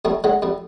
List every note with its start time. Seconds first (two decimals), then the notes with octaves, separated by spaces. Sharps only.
0.05 F2 G3 A3
0.24 D3 F#3 G#3
0.42 F2 G3